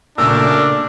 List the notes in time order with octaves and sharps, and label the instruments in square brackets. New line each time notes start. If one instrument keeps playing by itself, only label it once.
[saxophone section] F#2 A#4 [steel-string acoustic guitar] A#2 C#3 A3 [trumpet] D4 [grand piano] E6